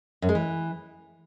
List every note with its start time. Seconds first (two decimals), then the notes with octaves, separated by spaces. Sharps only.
0.22 F#2
0.29 G#3
0.35 E3